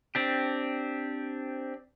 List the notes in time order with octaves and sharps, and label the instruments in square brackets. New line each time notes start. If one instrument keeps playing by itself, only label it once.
[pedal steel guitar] C4 D4 G4